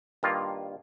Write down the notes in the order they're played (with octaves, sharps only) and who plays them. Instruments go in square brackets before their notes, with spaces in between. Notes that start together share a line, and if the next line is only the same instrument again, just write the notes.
[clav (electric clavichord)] G2 D#3 A#3 F4